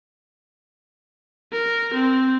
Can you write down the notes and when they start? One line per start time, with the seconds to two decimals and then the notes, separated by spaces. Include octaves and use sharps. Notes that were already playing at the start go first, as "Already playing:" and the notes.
1.52 A#4
1.94 C4